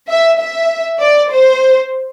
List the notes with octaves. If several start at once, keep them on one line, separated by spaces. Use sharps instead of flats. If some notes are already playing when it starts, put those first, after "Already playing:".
E5
E5
D5
C5